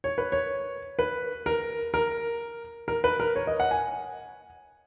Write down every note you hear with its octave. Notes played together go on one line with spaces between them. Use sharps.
C#5
B4
C#5
B4
A#4
A#4
A#4
B4
A#4
C#5
D#5
F#5
G#5